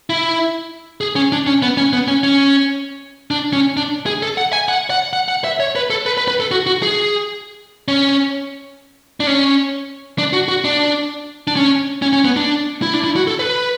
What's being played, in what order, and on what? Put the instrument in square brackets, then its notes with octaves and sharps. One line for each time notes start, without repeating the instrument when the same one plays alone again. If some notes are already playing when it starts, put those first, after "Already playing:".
[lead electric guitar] E4
G#4
C#4
D4
C#4
B3
C#4
B3
C#4
C#4
D4
C#4
D4
G#4
A4
F#5
G#5
F#5
F#5
F#5
F#5
E5
C#5
B4
A4
B4
B4
B4
A4
F#4
F#4
G#4
C#4
D4
C#4
D4
F#4
F#4
D4
D4
C#4
C#4
C#4
B3
D4
E4
D4
E4
F#4
A4
B4